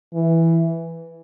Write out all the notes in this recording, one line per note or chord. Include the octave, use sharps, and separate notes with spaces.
E3